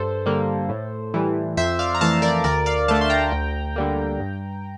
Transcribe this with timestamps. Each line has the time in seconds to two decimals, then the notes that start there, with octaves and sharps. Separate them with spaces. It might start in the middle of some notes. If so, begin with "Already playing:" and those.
Already playing: G2 A4 C5
0.26 D3 G3 A#3
0.69 A2
1.14 E3 G3
1.57 F2 C5 E5
1.79 D5 F5
1.95 A#5
2.01 E3 A3 F5 A5
2.22 A#4 D5
2.44 D2 A#4 D5
2.66 D5 F5
2.88 D3 A3 F5 A5
3.01 C6
3.10 G5 A#5
3.32 D2
3.76 D3 G3 A#3
4.19 G2